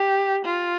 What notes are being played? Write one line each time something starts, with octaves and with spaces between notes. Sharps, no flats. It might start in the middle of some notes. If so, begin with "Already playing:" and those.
Already playing: G4
F4